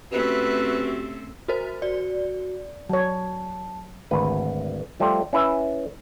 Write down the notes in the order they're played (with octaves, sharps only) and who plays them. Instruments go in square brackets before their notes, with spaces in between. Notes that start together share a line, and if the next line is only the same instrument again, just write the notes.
[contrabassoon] C3 [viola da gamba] A3 C4 C#4 [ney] F#4 [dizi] B4
[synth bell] F#4 A#4 C5
[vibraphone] F#4 [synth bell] D5
[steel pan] F#3 C#5 [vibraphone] A5
[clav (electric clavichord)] G#1 D2 B4
F3 G3 A3 C5 G5
C#4 E4 B4 E5